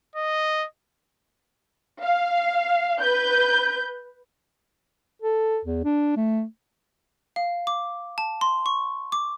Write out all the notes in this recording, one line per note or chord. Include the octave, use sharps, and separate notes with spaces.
D#5
F5
B4 G6
A4
E2
D4
A3
F5
D6
A5
C6
C#6
D6